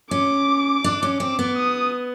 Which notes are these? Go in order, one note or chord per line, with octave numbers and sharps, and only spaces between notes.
C#4 D6
D4
C#4
C4 D6
B3
D#6